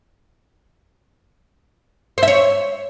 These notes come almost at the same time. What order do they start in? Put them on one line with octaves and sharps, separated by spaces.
C5 E5 C#5